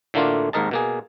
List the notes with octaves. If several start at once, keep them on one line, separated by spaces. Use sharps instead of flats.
A2 D3 A3 A#3 D4 F4
G#1 D#2 G#2 A#4 D#5 A5
B2 A#3 G#4